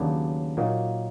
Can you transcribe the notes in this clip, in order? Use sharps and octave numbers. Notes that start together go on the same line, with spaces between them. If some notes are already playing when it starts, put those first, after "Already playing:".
Already playing: D#2 C#3 F#3 B3 D4
A#2 F#3 A#3 D#4